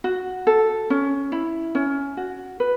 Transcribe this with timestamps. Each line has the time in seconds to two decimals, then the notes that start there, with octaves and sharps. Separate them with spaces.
0.04 F#4
0.47 A4
0.90 C#4
1.32 E4
1.75 C#4
2.17 F#4
2.60 B4